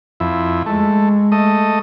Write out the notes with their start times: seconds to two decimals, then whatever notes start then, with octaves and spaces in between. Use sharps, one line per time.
0.20 F2 E4
0.66 G#3 A3
1.32 A3 D#5